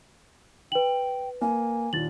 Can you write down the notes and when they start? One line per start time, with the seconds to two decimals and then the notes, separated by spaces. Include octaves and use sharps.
0.72 B4 G5 F#7
1.41 A#3 G#5
1.93 D#2 A#2 A6 F#7